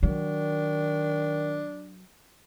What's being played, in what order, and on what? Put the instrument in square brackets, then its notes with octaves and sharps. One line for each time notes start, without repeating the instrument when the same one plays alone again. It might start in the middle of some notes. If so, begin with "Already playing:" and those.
[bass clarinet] D#3 [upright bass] F#3 [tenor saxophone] D4